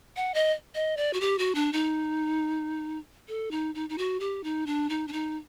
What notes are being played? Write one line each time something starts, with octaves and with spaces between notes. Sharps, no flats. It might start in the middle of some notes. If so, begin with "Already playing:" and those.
F#5
D#5
D#5
D5
F#4
G4
F#4
D4
D#4
A4
D#4
D#4
D#4
F#4
G4
D#4
D4
D#4
D4
D#4